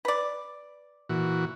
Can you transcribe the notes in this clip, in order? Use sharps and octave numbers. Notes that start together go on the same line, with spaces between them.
B4 D5
A#2 E3 F#4